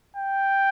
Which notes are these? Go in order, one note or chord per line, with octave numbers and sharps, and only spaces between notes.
G5